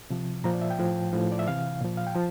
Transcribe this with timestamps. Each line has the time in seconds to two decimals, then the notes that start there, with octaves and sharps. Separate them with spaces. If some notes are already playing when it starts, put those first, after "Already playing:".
0.10 C3 F3
0.44 A#2 F3 A#5
0.54 D5
0.61 E5
0.70 G5
0.79 A2 F3
1.13 A2 F3
1.32 D5
1.39 E5
1.48 C3 E3 F5
1.81 A#2 F3
1.97 F5
2.07 G5
2.15 F3 A5